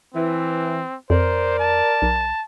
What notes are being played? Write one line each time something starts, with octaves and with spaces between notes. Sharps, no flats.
E3 C4
F2 A#4 C5 D5
A5
B1